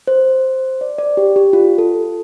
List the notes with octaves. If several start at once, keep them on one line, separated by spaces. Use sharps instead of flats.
C5
D5
D5
G4
G4
F4
A4